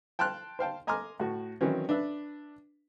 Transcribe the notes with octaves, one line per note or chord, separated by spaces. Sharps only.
G5 A5 C6 F6 F#6
C5 F5 G5 A5
D#5 G#5 A#5 C6 D6 F6
A2 F#4
D#3 E3 F#3 C4 C#4
D4 B4 E5